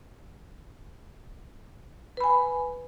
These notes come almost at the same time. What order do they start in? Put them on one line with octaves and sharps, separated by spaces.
B4 B5 G#5